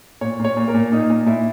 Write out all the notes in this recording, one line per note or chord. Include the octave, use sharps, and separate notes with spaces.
A#2 C#5
A#2
C#5
A#2
A#4
A#2
A#2 D#4
A#2
A#2 E4